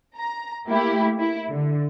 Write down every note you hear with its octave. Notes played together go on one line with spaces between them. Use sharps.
A#5
A3 A#3 E4 G4
E4
D3